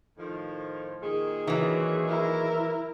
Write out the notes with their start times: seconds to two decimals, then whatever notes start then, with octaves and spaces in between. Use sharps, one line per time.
0.18 A2 D#3 F3
1.02 A#2 D#3 G#4
1.47 E3 F#3
2.08 E4 A#4